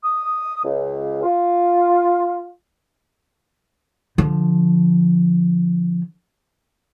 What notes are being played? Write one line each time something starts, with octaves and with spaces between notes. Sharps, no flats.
D#6
C#2
F4
D3 F3